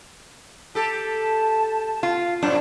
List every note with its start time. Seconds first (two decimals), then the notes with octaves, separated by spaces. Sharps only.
0.75 G4 A4 A5
2.03 F4
2.43 F#2 A2 C3 D4